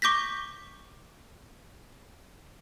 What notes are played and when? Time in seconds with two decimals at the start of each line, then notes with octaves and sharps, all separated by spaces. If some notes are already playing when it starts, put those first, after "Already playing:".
0.02 C#6 D6 G6 A#6 B6